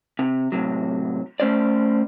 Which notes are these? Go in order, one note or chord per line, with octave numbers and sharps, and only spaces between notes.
C3
A2 C3 F#3
A3 C#4 C5 D5